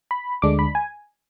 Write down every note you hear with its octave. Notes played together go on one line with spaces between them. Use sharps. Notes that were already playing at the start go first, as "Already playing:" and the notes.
B5
D2 D3 G#3 D4 D6
B5
G#5